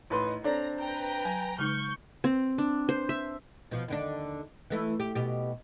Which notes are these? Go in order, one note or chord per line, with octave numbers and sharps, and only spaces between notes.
A1 D#4 B4 C6
C4 D4 A4 C#5 D5 A#5
B4 G5 A#5
F#3 G#5
C#3 G#3 D#4 C#6 F6 G6
C4
D4
C5
E5
B2 F3
D#2 D3 D4
E3 A3 E4
G4
B2 G4